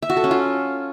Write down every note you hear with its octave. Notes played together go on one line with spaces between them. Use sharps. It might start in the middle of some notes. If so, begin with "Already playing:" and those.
E5
F#4
A4
C#4
F4